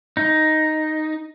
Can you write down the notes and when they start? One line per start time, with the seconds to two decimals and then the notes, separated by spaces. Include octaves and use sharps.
0.17 D#4